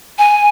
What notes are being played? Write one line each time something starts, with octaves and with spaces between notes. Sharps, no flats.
G#5